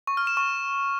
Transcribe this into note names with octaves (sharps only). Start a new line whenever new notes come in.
C#6
F6
E7
C#6